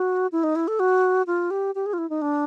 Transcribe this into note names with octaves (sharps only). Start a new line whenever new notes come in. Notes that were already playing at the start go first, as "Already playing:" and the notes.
Already playing: F#4
E4
D#4
E4
A4
F#4
F4
G4
G4
G#4
F4
E4
D#4
D4